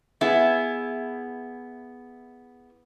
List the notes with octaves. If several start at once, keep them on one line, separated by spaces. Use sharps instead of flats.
B3 E4 G#4 E5